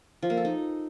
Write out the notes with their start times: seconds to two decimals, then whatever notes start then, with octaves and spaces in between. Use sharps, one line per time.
0.22 F3
0.30 A#3
0.37 A4
0.45 D#4